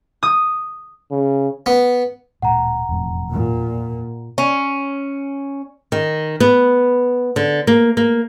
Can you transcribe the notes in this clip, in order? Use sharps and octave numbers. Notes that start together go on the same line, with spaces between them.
D#6
C#3
B3
D1 A#2 G#3 F#5 A#5
E1 F2 A2
A#2
C#4
D#3
B3
D3
A#3
A#3